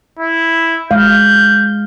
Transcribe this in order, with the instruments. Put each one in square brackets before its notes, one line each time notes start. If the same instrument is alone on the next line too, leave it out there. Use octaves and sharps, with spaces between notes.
[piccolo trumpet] E4
[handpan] G#3 F5 [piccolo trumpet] G6